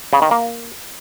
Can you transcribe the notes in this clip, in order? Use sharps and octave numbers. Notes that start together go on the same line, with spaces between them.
C#3
D#3
A#3